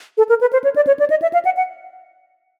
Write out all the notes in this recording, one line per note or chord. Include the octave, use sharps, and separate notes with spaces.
A4
A#4
B4
C5
C#5
D5
C#5
D5
D#5
E5
F5
F#5
F#5